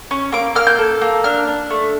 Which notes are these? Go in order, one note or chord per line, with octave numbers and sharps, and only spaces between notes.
C#4
A#3 D6
A#3 F6
G6
A4
A#3
D4 F6
D4
A3